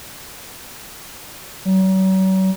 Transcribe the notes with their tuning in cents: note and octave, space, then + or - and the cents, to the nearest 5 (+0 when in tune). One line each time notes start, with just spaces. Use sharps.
F#3 +40